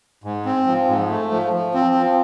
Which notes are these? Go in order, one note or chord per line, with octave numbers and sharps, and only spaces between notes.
G#2
C4
F3
G#2
A3
F3
F3
C4
F3